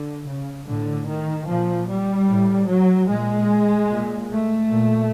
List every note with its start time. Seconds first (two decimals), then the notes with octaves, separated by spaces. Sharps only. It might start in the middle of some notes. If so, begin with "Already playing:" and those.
Already playing: D3
0.27 C#3
0.67 A2 D3
1.07 D#3
1.48 A#2 F3
1.88 G3
2.28 A2
2.69 F#3
3.09 A#2 G#3
3.90 A#2
4.30 A3
4.70 A#2